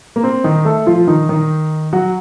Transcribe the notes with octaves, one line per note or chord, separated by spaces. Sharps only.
A#3
C4
D#3 D#4
A3 A4
F3 F4
D#3 D#4
D#3 D#4
F#3 F#4